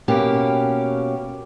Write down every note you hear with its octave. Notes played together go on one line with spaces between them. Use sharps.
B2 A#3 C#4 G4